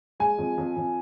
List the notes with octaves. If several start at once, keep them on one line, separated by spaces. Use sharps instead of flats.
G#3 G#5
F2
F2
F2